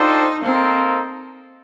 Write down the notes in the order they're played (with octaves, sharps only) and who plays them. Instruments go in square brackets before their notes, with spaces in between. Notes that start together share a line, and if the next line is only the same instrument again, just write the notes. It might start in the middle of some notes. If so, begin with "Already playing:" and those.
Already playing: [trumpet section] D4 F4 A4 C5 G5 [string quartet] D#4
[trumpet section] A#3 D#4 A4 C5 [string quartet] C4